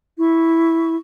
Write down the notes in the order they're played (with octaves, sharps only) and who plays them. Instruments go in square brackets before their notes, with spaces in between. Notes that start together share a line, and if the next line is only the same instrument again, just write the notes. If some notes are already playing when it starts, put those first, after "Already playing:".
[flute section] E4 C#6